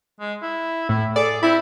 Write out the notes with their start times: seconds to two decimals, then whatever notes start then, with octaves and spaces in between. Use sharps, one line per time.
0.20 G#3
0.43 E4
0.89 A2 E4
1.16 G#4 A4 D5
1.43 C4 E4 B5